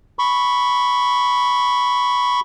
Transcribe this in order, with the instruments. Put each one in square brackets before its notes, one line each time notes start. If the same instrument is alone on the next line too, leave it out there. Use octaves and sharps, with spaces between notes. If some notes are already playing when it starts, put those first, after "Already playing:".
[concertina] B5 C#6